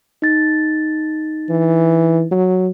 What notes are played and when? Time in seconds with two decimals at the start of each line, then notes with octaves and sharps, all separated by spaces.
0.22 D#4 A6
1.49 E3
2.31 F#3